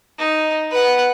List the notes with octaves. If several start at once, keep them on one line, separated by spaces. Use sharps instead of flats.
D#4
B4 F#5